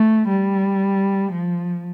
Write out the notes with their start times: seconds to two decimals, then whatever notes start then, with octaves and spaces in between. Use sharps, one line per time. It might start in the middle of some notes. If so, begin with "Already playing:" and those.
Already playing: A3
0.28 G3
1.32 F3